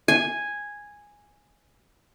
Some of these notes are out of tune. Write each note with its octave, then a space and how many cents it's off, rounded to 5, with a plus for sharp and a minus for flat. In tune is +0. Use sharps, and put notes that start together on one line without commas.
G#5 -5